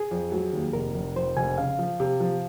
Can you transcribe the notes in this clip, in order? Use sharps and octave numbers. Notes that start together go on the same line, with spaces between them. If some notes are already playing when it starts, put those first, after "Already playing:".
Already playing: G#4
F2
F#3
D#2
F1 A#4
F1
F2 C5
F1 G#5
C#3 F5
F3
C3
F3